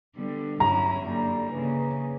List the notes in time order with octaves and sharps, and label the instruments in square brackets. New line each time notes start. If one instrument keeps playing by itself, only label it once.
[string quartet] D3 G3 B3
[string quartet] G2 F#3 C#4 E4 [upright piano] A#5
[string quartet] F#2 D3 G3 A#3
C#3 E3 A#3